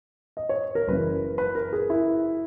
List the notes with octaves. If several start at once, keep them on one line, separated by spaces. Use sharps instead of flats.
D#5
C#5
A#4
F#1 F#2 C#3 E3 B4
B4
A#4
G#4
E4